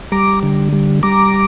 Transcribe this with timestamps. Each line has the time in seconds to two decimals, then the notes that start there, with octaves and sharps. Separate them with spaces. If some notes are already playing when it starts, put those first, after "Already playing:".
0.12 G3 A#5 D6
0.43 D3
0.73 G3
1.03 G3 A#5 D6